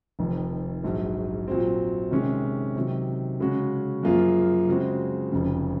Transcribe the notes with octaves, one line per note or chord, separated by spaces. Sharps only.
F1 F2 D#3
A#1 G#2 F#3
A#2 F#3 C4
C3 D#3 G#3 C#4
C3 D#3 F#3
C#3 G#3 C#4 F#4
F#2 F3 A#3 F4 G#4
C#3 G#3 C4 F#4
F1 F2 C#3